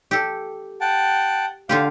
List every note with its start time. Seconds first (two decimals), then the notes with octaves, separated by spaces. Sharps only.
0.11 G4 A4
0.81 F#5 G5 A5
1.69 D3 F4 G4 F5